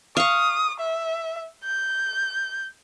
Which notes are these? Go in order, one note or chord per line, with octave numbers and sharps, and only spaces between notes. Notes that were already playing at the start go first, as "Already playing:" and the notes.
F5 C#6 D#6
E5
G6